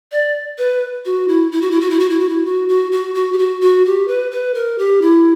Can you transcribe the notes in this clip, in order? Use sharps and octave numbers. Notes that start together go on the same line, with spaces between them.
D5
B4
F#4
E4
E4
F#4
E4
F#4
E4
F#4
E4
F#4
E4
F#4
F#4
F#4
F#4
G4
F#4
F#4
G4
B4
B4
A#4
G4
E4